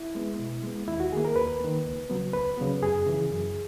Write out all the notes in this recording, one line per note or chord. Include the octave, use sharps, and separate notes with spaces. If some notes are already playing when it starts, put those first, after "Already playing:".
Already playing: E4
G#3 B3
B2
G#3 B3
D#2 E4
F#4
D#3 A#3 G#4
A#4
D#2 B4
D#3 A#3
C#2
C#3 F#3 B3
C#2 B4
C#3 F#3 B3
F#2 G#4
C#3 E3
F#2